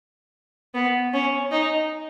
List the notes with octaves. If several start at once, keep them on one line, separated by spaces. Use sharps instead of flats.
B3
C#4
D#4